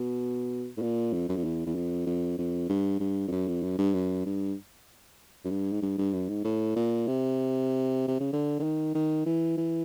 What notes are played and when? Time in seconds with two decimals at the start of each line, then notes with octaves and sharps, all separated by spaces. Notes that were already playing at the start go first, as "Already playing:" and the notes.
Already playing: B2
0.77 A2
0.81 A#2
1.13 F2
1.29 F#2
1.36 F2
1.44 E2
1.66 E2
1.75 F2
2.06 F2
2.38 F2
2.69 G2
3.00 G2
3.28 F2
3.32 F#2
3.47 F2
3.63 F#2
3.79 G2
3.94 F#2
4.26 G2
5.45 F#2
5.50 G2
5.72 G#2
5.82 G2
5.98 G2
6.13 F#2
6.29 G#2
6.44 A2
6.76 A#2
7.07 C3
8.08 C3
8.20 C#3
8.33 D3
8.59 D3
8.63 D#3
8.95 D#3
9.26 E3
9.57 E3